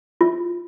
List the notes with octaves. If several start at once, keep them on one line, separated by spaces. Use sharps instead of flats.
F4